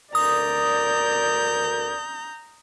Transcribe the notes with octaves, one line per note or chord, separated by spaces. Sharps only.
D2 A#4 D5 A#5 D#6 G6